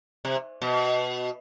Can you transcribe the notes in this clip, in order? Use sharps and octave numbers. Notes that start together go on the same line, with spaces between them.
C3
B2